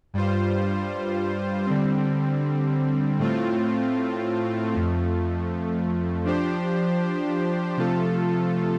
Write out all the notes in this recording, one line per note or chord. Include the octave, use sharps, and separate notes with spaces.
G2 G3 F4 C5
D3 G3 C4
A2 A3 C4 F4
F2 F3 A3
F3 D4 G4 C5
C3 F3 A3 F4 A4